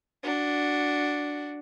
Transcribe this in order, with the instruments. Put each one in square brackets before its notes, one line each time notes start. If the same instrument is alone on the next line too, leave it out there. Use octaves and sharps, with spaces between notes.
[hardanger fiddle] D4 F#4